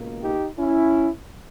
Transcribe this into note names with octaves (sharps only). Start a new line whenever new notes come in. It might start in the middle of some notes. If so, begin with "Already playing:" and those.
Already playing: C#2 B2 A#3
D#4 G4
C#4 E4